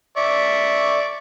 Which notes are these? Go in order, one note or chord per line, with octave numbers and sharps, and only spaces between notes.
D5 E5 C#6